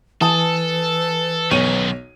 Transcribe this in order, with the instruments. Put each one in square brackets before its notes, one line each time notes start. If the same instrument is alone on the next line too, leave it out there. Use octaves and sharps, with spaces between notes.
[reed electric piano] E3 [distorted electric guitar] A4 [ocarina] B4 [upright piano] G#5 A5 D#6
[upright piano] B1 C#5 D#7 [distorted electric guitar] F#2 D#3